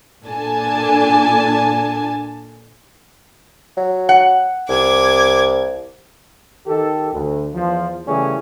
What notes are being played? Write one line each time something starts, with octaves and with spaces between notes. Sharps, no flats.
A#2 D4 A4 G#5 A5
F#3
F#5
C2 D6 G#6
D#3 G4 A4
D2
E2 F3
C#3 E3 G3 A3 C#4 G#4